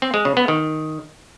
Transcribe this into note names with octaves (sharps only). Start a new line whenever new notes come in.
C4
G#3
C#3
B3
D#3